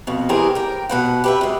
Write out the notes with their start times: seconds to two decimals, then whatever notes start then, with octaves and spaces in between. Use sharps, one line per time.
0.07 F2 B2
0.29 E3 G3 G4 G#4 A#4 C5
0.55 A#4 G5
0.89 B2 B4 F#5
1.24 G4 B4 E5
1.41 F#2 G#3